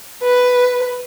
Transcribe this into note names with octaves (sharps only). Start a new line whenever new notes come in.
B4